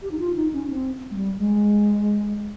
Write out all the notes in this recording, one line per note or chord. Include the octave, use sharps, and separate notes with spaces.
G4
D#4
F4
D#4
C#4
C4
G#3
G3
G#3